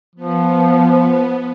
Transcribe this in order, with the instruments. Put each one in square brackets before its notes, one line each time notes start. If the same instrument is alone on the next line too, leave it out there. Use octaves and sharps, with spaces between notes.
[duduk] F3 [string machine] B3